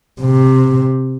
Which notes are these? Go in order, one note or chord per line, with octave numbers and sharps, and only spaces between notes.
C3